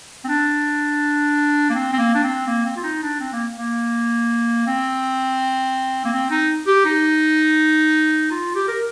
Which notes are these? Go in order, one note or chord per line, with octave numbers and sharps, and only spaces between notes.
C4
D4
A#3
C4
C4
A#3
D4
C4
A#3
C4
F4
D#4
D4
C4
A#3
A#3
C4
A#3
C4
D#4
G4
D#4
F4
G4
A#4